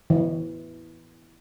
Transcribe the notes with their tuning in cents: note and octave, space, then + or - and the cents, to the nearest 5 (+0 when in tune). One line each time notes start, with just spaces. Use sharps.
E3 -5